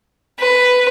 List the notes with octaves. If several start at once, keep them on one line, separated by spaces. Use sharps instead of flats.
B4